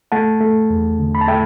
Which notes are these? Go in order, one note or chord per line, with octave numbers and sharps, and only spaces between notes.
A3 F#5 A5
A3
E2
D3
B5
A5
A3 E5 G5